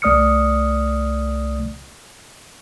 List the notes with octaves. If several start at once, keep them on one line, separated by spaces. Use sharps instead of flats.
C2 A3 D5 D#6 F6 C#7